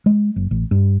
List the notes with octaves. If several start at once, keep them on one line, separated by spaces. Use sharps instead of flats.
G#3
F#1
A1
G2